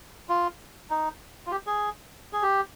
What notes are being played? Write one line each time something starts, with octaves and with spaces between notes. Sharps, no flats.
F4
D#4
F4
G4
G#4
G#4
G4